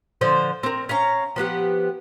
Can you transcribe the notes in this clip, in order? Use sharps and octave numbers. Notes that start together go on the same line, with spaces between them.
D3 F3 C5
C4 A#4
C#4 F5 A#5
F3 B3 G4 F#5